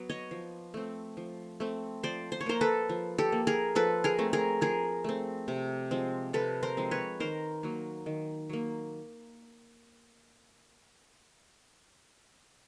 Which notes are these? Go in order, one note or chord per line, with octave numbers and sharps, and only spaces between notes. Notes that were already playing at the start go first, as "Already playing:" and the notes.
Already playing: F#3 B3
C#5 D#5
F3
A3 C4
F3
A3 C4
F3 C5 D5
C5
C#5
A#3 A#4 C5
A4 B4
F3
G4 A4
A#3
G#4 A#4
F3 A4 B4
G#4 A#4
A3 C4
G#4 A#4
F3 G#4 A#4
A3 C4
C3
F3 G#3 C4
C3 A4 B4
A#4 C5
F3 G#3 C4
B4 C#5
D#3 A#4 C5
F#3 A#3
D#3
F#3 A#3